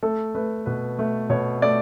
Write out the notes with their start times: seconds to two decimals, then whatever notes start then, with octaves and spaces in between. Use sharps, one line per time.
0.03 A3 A4
0.35 A3 B4
0.66 B2 B4
0.99 A3
1.30 B2 C#5
1.62 A3 D5